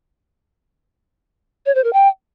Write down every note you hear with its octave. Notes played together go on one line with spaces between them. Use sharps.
C#5
C5
A#4
G5